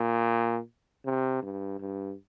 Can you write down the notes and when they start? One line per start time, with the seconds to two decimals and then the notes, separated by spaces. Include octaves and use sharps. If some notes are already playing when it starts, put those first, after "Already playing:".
Already playing: A#2
1.05 C3
1.42 G2
1.80 G2